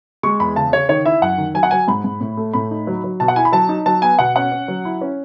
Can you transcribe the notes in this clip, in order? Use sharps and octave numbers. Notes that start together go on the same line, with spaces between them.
G#3 C#6
E2 B5
C#3 A5
C#3 C#5
D#3 C#5
E4 E5
F#2 F#5
D#3
F#3 G#5
F#5
F#3 G#5
G#2 B5
G#2
A2
A3
A2 B5
D#4
F#3
F#3
B2 A5
F#5
E4 G#5
B5
F#3 A5
D#4
F#3 A5
B3 G#5
B2 F#5
C#4 F#5
C#4
F#3
E4
C#4